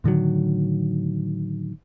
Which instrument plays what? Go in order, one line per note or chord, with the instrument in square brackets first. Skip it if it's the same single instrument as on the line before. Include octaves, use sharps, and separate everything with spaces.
[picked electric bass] A2 D3 D#3 F#3